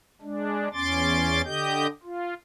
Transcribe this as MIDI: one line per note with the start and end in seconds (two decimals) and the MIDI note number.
0.22 0.68 56
0.22 0.68 62
0.74 1.41 40
0.74 1.41 61
0.74 1.41 84
0.74 1.41 86
0.74 1.41 93
1.44 1.87 50
1.44 1.87 67
1.44 1.87 75
1.44 1.87 91
2.03 2.34 65